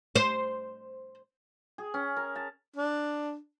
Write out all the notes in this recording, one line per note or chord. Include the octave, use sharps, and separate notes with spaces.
C5
G#4
C#4
A#4
A5
D4